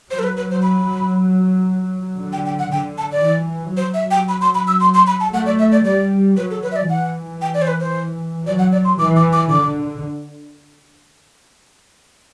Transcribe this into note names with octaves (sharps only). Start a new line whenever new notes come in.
F#3 C5
A4
B4
B4
C5
B5
D3
G5
G5
F#5
D3 G5
A5
D5
E3
F#3 C5
E5
G5
B5
C6
B5
E6
C6
C6
B5
A5
A3 F#5
D5
E5
D5
G3 D5
F#3 B4
A4
B4
E5
D5
E3 F#5
G5
D5
C5
B4
C5
F#3 D5
F#5
D5
C6
E3 D6
D6
D6
D3 D6